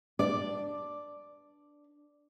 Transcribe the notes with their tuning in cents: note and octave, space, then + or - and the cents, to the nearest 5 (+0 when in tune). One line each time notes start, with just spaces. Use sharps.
D4 +0 D5 +0